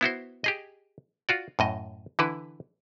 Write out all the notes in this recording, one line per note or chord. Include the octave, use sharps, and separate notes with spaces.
B3 E4 F#4 C5
G4 G#4 D#5
F4 F#4 D5
F#2 A2 D#5
D3 E3 E4 B4